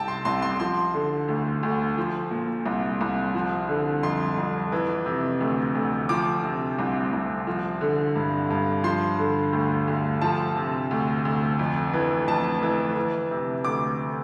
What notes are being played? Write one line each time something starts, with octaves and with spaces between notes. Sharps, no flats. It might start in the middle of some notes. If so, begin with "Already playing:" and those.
Already playing: C2 C3 G5 A5
C6
C2 C6
C6
F3 C6
D3
D2
D2
F3
A#2
C2
C2
F3
D3
F2 C6
F2
E3
C3
D2
D2
F3 D6
C3
C2
C2
F3
D3
G2
G2
F3 C6
D3
D2
D2
F3 A5
C3
D2
D2
F2
E3
F2 A5
E3
E3
C3
D2 D6